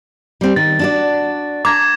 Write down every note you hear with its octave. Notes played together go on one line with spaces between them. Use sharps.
G3 C4
D#3 A6
D4 F#4 D5
A#5 D6 G#6